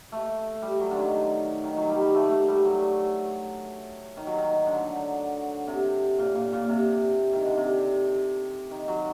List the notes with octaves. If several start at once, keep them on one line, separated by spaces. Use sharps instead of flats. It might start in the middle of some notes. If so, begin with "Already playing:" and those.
A3
G3
F#3
D3 D#3
D#3
F#3
G3
G3
A3
A3
G3
F#3
D#3
F#3
D#3
D3
C3
A#2
A#2
A#2
C3
D#3
D3
C3
D#3
F#3